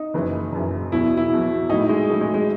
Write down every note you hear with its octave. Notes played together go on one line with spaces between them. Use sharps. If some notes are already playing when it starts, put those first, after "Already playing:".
Already playing: D#4
F#1 F#2 E3
F#1 F#2 E3
E1 E2 B2 F#3 E4
E4
E1 E2 B2 F#3
A2 F#3 A3 D#4 E4
G#3
A2 F#3 A3 E4
G#3
G#3